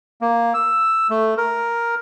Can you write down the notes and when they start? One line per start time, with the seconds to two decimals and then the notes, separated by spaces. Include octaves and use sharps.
0.21 A#3
0.54 E6
1.10 A3
1.38 A#4